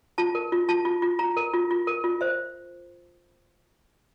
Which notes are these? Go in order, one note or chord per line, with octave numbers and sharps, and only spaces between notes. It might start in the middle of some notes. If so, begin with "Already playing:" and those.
F4 A5
A#4
F4
F4 A5
F4
F4
F4 A#5
A#4
F4
F4
A#4
F4
C5 E5